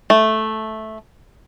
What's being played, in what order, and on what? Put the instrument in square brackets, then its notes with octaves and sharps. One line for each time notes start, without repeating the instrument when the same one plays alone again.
[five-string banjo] A3